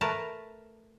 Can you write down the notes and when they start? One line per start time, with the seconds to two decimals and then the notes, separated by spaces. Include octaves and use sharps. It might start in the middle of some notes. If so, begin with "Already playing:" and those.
0.01 A3 A#4 B4 A5